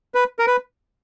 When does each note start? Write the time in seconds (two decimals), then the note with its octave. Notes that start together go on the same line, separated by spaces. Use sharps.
0.14 B4
0.39 A#4
0.47 B4